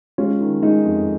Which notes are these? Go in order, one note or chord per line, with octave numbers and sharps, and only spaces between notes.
G#3 C#4 F4
D#3
G#3 D#4
F2